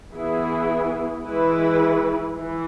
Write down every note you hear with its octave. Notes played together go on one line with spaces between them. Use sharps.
E3 B3 E4 G#4
E3 G#3 E4 B4
E3